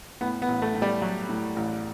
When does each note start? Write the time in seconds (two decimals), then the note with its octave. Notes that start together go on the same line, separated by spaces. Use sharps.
0.21 A2 B3
0.42 B3
0.48 A1
0.62 A3
0.75 A2
0.82 G3
1.02 F#3
1.29 A2
1.56 A1